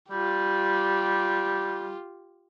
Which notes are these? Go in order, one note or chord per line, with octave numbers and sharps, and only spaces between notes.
G3 F4 G4